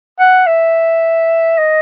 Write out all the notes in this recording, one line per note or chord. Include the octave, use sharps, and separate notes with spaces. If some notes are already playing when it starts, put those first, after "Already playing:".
F#5
E5
D#5